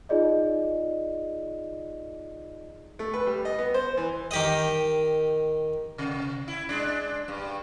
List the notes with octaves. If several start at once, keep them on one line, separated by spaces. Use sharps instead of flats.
D#4 F4 G#4 D5 D#5
A3
B4
G3
D#5
B3
C5
E3
D#3 G4 D#5
C3
E4
G#3 D4
G2